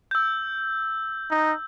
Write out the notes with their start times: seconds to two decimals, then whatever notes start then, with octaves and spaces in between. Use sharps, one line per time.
0.11 E6 G6
1.31 D#4